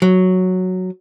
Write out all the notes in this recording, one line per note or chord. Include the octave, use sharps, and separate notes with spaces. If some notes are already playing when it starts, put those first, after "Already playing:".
F#3